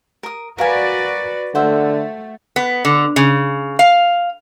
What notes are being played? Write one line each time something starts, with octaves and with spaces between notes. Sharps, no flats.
A#4 D#6
F#4 A#4 B4 D5 F5 G#5
D3 A3 F#4 C5 E5
B3
D3
C#3
F5